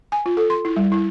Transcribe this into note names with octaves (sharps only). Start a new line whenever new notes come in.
G#5
F4
A4
C6
E4
G3
E4